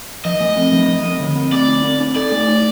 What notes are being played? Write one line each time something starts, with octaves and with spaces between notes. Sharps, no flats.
F3 D#5
A3
C4
F3
F3
C4
D3
C4
A3 D5
D#4
C4
D#4
A4 D5
A3
D#4